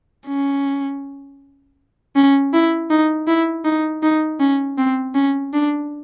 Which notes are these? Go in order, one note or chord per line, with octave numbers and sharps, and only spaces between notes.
C#4
C#4
E4
D#4
E4
D#4
D#4
C#4
C4
C#4
D4